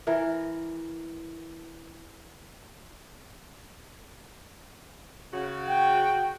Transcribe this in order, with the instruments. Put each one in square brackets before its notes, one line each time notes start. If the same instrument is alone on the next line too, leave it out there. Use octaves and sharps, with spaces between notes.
[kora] E3 A#4
[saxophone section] C#3 F#4
[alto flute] G5